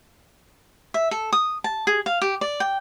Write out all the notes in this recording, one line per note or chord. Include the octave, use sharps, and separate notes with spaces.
E5
A4
D#6
A5
G#4
F5
G4
D5
G5